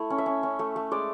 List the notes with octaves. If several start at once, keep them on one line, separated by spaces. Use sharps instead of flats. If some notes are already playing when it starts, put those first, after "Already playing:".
Already playing: A3 E4
C#4
E5
C#4
C#4
A3
A3
G#3 D5